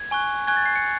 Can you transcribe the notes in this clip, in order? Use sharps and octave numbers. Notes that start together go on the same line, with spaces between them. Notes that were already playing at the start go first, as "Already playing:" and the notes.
Already playing: G#6
G#5 C#6 F#6
G#5 C#6 F#6 G#6
A6
C7
C#7